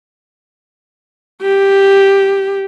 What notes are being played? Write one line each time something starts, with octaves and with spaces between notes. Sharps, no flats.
G4